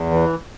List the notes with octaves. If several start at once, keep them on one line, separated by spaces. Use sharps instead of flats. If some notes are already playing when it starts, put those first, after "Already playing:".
Already playing: E2
E3